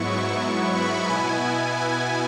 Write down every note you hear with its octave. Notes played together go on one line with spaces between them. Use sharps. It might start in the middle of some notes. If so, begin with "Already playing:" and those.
Already playing: G#2 F#3 B3 E4 C#6
C#6
B5
B2 B3 E4 G#5
G#5